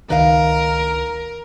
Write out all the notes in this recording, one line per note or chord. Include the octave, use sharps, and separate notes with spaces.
C#2 D#3 A#4 B4 D#5 F5